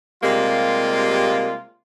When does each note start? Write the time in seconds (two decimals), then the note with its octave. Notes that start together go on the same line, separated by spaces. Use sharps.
0.23 C3 G3 G#3 A#3 F4